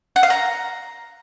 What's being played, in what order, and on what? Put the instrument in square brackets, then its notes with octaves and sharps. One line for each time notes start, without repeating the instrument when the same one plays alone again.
[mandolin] F#5
F5
A#5